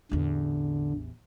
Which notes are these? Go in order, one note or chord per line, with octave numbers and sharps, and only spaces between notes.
A1 E2 D3